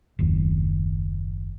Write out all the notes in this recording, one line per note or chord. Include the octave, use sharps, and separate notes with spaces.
F#1 D#2